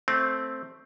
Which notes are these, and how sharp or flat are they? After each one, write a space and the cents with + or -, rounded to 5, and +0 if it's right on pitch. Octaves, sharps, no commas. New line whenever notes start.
A3 +0 C4 +0